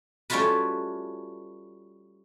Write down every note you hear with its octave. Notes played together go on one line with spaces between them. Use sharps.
G3 A3 C#4 F4 F#4 B4